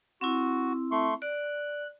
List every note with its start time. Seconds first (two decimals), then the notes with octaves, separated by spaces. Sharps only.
0.21 C4 E4 F#4
0.92 A3 C6 C#6
1.22 D5 F#6